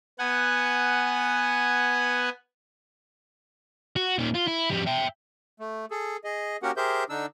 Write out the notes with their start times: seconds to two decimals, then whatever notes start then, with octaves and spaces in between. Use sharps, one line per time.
0.19 B3 F#5 G#5
3.96 F#4
4.19 A#2 D#3
4.35 F4
4.48 E4
4.71 F2 G3
4.87 E5 G5
5.60 A3
5.91 G#4 A4
6.24 G#4 D#5
6.63 A#3 C#4 F#4 G4 A#4 F#5
6.77 G4 G#4 A#4 C5 E5 G6
7.10 D3 D4 D#4 E6